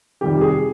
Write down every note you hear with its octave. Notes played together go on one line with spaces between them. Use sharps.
F2 C3 D#3 G3 G4
G#4